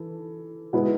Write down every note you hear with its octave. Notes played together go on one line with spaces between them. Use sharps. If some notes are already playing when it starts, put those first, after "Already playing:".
Already playing: E3 A4
B2 G#3 B3 E4